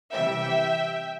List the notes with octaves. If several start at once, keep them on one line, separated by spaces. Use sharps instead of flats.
C3 E3 G3 E5 G5